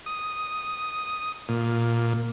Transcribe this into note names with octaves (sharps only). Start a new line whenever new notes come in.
D#6
A#2